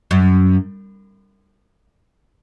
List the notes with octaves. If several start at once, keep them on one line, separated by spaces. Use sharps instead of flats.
F#2